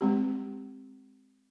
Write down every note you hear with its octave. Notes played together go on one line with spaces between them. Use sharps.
G#3 C4 G4